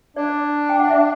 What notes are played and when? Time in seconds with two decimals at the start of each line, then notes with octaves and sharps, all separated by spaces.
0.16 D4 D5
0.69 G5
0.80 F#5
0.90 E5